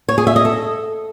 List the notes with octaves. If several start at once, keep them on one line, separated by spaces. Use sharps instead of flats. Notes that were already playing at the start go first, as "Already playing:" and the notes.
C#5
G#4
E5
D#5
A4